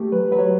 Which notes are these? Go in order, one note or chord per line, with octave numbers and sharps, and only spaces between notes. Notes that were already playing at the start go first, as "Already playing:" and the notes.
Already playing: A3 G4
F#3 B4
F#3 B4
C#5